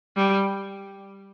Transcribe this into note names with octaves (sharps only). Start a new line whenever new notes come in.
G3